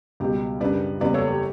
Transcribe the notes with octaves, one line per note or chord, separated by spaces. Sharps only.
C#2 B2 G3 G4
F#2 C#3 G3 D4 B4 D5
F#1 E2 C#3 G3 B4 D5
A4 C#5
G4